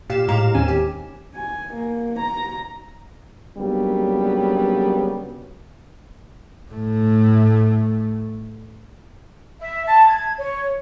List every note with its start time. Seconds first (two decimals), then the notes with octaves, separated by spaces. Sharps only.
0.10 A#2 G4 F5 E7
0.28 A2 G#3 G4 F5 A#5 E7
0.54 D#2 D#3 C4 C#4 G#5 E7
0.68 G4
1.35 G#5
1.74 A#3
2.19 A#5
3.58 C#3 F#3 G3 A#3 B3 D4
6.72 A2 A3
9.61 E5
9.85 A5
10.07 G#6
10.39 C#5